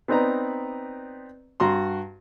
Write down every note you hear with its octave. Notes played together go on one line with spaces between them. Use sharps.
B3 C4 D#4 B4 D5 A#5
G2 F#4 A#5 C6